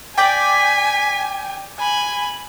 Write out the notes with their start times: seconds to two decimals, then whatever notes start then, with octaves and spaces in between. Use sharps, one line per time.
0.18 D5 G5 G#5 B6
1.80 G#5 B5